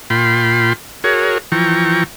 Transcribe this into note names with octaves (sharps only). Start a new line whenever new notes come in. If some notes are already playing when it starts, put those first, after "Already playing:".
A#2 F4 G5 B5 C6
F#4 G#4 A#4 C#5
E3 F3 G5 A#5 C#6